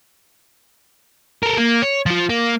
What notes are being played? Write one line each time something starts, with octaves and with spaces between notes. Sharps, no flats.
A4 A#4
A#3
C#5
F3 F4
A#3